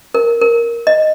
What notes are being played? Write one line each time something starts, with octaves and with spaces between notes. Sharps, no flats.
A#4
A#4
D#5